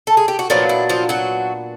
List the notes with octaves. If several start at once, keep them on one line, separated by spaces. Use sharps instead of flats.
A4
G#4
G4
F#4
A#2 F3 F#3 B3 D4 F4
E4
F3 F4
F#3 F#4